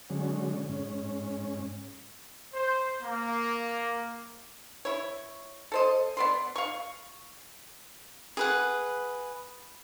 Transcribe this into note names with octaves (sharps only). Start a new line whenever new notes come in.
D3 F#3 G#3 C#4
G#2 C#4
C5
A#3
E4 C#5
A4 C5 D#5
B3 D5 C6
F5 C#6
G#4 B4 F#5